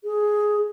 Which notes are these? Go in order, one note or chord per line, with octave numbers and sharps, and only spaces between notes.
G#4